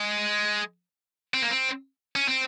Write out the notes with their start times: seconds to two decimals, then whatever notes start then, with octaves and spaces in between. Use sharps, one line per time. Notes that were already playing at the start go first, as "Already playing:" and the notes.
Already playing: G#3
1.34 C4
1.42 A#3
1.50 C4
2.16 C#4
2.28 C4